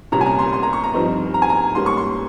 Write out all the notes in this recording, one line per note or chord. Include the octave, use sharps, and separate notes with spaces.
C2 A#2 G3 C#4 A#5
G#5
A#5
C6
C6
A#5
C#6
A#5
G2 F3 C4 D#4
A#5
G#5
A#5
G#2 G3 A#3 C#4 C6
C#6
C6